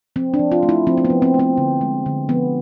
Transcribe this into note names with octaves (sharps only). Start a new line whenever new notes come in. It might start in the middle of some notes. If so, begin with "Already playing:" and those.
F3 C4
D4
F3
F4
A3
E4
F3 C4
C4
B3
F3
C4
A3
C4
D3
G#3
D3
F3 B3